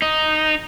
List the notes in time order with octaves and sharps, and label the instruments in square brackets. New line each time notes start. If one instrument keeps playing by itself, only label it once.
[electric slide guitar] D#4